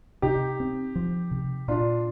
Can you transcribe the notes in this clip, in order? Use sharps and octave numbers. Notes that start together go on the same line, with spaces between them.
C3 D#4 G4
C4
F3
C3
A#2 D4 F4